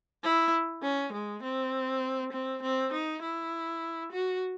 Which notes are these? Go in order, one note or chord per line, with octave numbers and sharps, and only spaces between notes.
E4
C#4
G#3
C4
C4
C4
D#4
E4
F#4